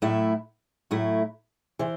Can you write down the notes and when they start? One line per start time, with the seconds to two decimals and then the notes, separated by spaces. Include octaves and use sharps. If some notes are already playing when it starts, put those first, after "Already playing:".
0.02 A2 F#3 A3 E4
0.91 A2 F#3 A3 E4
1.79 C3 E3 C5